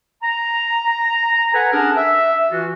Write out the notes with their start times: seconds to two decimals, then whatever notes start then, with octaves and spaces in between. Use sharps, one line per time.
0.23 A#5
1.53 A4 B4 F#5 G#5
1.73 C#4 D4 G#4 A#4 F#5 A5
1.97 E5
2.52 E3 F4 F#4